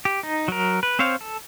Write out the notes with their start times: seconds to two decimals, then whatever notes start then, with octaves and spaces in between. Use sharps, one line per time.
0.05 G4
0.23 D#4
0.48 F#3 A#4
0.83 B4
0.99 C4 C5 C#5 F5
1.21 A4